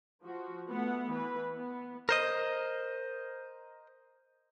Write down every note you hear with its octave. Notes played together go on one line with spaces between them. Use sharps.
F3 F#4
A3 B3 F#5
E3 B4
B3
A#4 C5 D#5